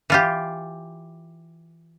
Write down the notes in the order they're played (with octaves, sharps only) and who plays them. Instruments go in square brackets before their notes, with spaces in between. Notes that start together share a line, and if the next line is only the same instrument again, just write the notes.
[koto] E3 F4 G4